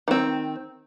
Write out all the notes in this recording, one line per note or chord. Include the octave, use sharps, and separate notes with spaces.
D#3 C4